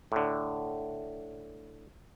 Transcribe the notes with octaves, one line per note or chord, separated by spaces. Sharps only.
A2 D3